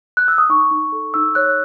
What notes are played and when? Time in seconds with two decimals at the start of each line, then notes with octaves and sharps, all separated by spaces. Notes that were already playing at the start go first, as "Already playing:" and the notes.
0.17 F#6
0.28 E6
0.38 D#6
0.49 D#4 C#6
0.71 D#4
0.92 A4
1.14 D#4 E6
1.35 C#5 F#6